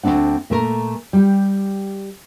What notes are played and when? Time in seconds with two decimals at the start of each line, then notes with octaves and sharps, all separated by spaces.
0.03 D2 D3 C4 D4 F#5
0.50 A#2 A3 A#4
1.13 G3 G4